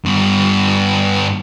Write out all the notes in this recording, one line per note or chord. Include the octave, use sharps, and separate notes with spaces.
G2 B3